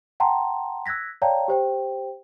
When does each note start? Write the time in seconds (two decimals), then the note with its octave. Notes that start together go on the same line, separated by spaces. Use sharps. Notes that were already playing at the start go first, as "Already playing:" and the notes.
0.20 F#5 G5 A5 A#5 C6
0.86 E6 F#6 G#6 A#6 B6
1.22 C#5 D5 F5 G5 A5 A#5
1.48 G4 C5 G5